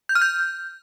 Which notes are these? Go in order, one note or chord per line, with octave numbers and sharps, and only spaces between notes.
G6
F6
G6